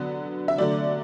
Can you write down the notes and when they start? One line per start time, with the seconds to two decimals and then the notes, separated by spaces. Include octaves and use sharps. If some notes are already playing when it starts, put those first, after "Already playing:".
Already playing: D3 F#3 B3
0.48 E5
0.58 D3 F#3 A3 D5